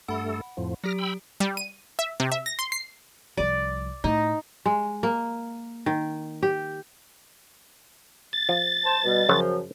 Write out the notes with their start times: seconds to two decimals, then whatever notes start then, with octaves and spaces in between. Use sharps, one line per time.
0.08 G2 A3 A4 F#5 B5
0.57 F2 A2 F3
0.84 F#3 G4 F6 A#6 D7
0.98 G5 B5 E6
1.40 G3
1.57 D#7
1.99 E5
2.20 C3
2.32 E5
2.46 A#6
2.59 C6
2.72 C7
3.37 C2 F3 D5
4.04 A2 A3 D#4
4.66 G#3
5.03 A#3
5.86 D#3
6.43 G4
8.33 A6
8.49 F3
8.85 C5 A5
9.04 B2 G3
9.29 F#2 C#3 F3 F#3 C5